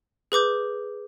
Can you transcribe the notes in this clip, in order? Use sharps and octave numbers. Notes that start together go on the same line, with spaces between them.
G#4 B4 D6 G6